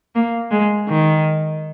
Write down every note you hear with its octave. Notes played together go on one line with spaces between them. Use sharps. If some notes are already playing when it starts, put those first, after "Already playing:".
A#3
G#3
D#3